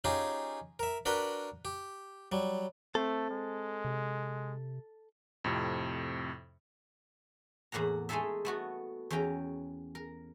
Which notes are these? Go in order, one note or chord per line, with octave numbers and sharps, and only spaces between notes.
C#4 D#4 F4 G4 G#4
A#4 E5
D4 F#4 A#4 B4 G5 B5
G4
F#3 G3
A3 C4 A4
G#3
C3
F2 A2 C3
E2 A2 A#3 F#5 A#5
G#3 A3 D#4 G#4 A4 E5
A3 B3 F#4
E2 E3 C#4 G5 A#5
A#4